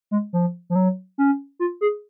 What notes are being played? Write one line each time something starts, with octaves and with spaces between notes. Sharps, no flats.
G#3
F3
F3
F#3
C#4
F4
G#4